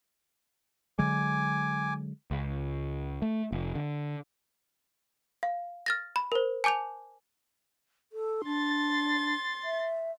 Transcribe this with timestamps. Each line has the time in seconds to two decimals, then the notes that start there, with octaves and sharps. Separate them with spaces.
0.99 D3 F#3 G#3 G#5 D6
2.31 C#2
3.22 A3
3.52 F1
3.75 D3
5.43 F5
5.86 F6 A6 A#6
6.16 B5
6.32 A#4 C5
6.64 G#5 A5 D6 G6 F7
8.13 A4
8.45 D4 C6 A6
9.64 E5